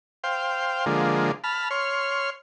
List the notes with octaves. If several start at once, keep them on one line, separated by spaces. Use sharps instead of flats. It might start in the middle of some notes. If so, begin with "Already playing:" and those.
C5 F5 G5
D3 F3 G#3 A#3
A5 B5 F6
C#5 C6 F6